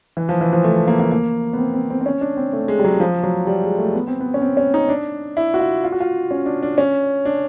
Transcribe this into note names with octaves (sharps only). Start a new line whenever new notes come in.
E3
F3
E3
F3
A3
A#3
A#3
A#3
B3
C4
C4
C4
C4
C#4
D4
C4
A3
G#3
G3
F#3
F3
F#3
G3
G#3
A3
B3
C4
B3
C#4
C4
C#4
D#4
D4
E4
F#4
F4
F4
F#4
F4
C#4
D4
D4
C#4
D4